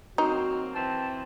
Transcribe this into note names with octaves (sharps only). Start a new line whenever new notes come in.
F#3 A#3 C4 D#4 F#4
E3 C4 A5